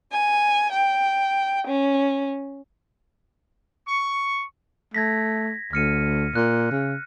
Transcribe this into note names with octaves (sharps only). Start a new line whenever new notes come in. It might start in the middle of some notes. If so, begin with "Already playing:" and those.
G#5
G5
C#4
C#6
A3 G#6 A#6 B6
D2 F6 C#7 D#7
A#2 F#6
C#3